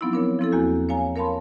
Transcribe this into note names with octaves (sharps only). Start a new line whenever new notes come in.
F3 F#3 B3 C4 D#4 E4
D4 A#4 C#5
F3 C4 E4 A4
E2 A#3 F#4 G6
C#5 F5 G#5 A#5
A#4 C#5 F5 A5 B5 C6